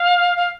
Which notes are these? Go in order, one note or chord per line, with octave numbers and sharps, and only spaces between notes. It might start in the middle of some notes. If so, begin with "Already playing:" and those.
Already playing: F5
F5